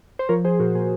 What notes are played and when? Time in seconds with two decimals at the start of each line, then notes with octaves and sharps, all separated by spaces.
0.19 C5
0.29 F3 A#4 C#5
0.44 F3 G#4 C5
0.60 A#2 F#4 A#4
0.75 A#2 G#4 C5